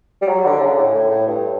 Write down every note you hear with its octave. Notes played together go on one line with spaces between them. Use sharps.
G3
F#3
D3
C#3
A2
A2
A2
G2